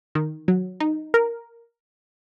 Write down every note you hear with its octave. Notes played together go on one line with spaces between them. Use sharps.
D#3
F#3
D#4
A#4